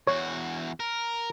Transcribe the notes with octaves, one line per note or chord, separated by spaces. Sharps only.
E2 F#4 C#5
A#4